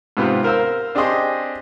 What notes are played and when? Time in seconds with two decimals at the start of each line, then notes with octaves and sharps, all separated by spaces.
0.17 G#2 C3 B3 C4 F4
0.44 A#4 C5 F5 E6
0.95 C4 D4 G4 G#4 D#5 C6